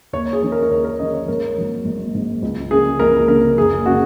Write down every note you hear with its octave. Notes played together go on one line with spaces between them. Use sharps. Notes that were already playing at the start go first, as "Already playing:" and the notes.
D#2 C#5
G#4
D#3 G#3 C#4
A#4
A#4
D#2 C#5
A#4
D#3 G#3 C#4 D#5
C#5
G#1 A#4
G#2 F#3 A#3
G#1
G#2 F#3 A#3
C#2
C#3 A#3 C#4 G#4
C#2 A#4
C#3 A#3 C#4 A#4
F#1 G#4
C#3 G#3 C#4 F#4